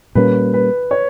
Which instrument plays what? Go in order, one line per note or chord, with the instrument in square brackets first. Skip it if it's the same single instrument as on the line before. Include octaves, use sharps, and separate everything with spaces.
[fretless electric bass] A#2 G3 A#3 C#4 [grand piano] B4
[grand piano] B4
C#5